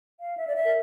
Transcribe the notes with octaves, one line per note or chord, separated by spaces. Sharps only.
F5
E5
D5
E5
A#4